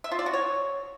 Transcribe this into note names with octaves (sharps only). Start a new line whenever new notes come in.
E5
F4
D5
F#4
C#5